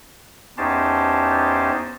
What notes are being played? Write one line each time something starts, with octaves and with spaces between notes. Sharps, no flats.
E2 C#4 D#4 G4 C5 A5